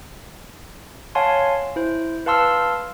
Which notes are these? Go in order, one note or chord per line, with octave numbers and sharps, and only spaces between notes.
C#5 F5 F#5 G#5 A5 C6
E4 C5
B4 F5 A5 C6 E6 F6